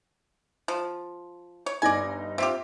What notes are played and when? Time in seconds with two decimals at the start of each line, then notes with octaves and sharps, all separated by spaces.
0.68 F3
1.66 C#5
1.82 G1 D#4 D5 G#5 A#6
2.38 C4 F4 G4 E5